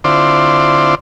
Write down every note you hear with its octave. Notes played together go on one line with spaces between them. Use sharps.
D3 C4 E4 F4 C5 D5